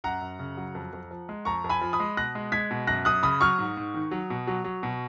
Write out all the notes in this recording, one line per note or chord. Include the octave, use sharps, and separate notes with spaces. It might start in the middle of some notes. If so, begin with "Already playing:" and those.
F#2 F#5 A#5
F#2
C#3
F#3
F2
F2
F3
G#3
F2 A#5 C#6
F2
G#5 B5
F3
B5 D#6
G#3
B2 F#6 A#6
G#3
G#3 G#6 B6
B2
F#2 F#6 A#6
F#2 D#6 F#6
C#3 B5 D#6
F#3 C#6 F6
G#2
G#2
D#3
F#3
B2
F#3
F#3
B2